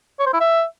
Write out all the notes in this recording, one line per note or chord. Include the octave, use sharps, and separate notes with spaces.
C#5
C5
E4
E5